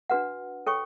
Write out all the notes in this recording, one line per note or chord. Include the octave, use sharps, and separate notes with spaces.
D4 F#4 B4 F#5
A4 C#5 G5 C#6